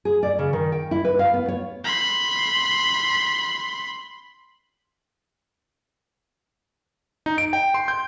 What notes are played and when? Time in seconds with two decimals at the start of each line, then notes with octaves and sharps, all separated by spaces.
0.05 G#4
0.23 D5
0.39 C#3
0.53 D#3
0.72 G5
0.91 E4
1.05 B4
1.19 F5
1.34 B3
1.48 C#5
1.84 B5 C6
7.26 D#4
7.38 D7
7.53 G5
7.74 C6
7.88 G6